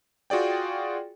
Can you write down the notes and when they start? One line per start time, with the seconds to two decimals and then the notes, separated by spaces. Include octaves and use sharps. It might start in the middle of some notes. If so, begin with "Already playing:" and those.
0.30 F4 F#4 G#4 D5 G5